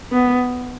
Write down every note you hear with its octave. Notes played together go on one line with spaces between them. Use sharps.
B3